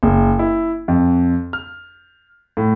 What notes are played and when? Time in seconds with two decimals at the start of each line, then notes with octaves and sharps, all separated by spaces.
0.03 F#1
0.39 E4
0.88 F2
1.53 F6
2.57 A2